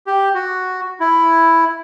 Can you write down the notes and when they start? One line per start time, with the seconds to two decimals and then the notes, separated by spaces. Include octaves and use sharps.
0.07 G4
0.35 F#4
1.00 E4